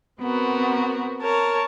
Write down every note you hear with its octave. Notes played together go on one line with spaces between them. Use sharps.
B3 C4 F#4 A#4
A#4 C#5 A5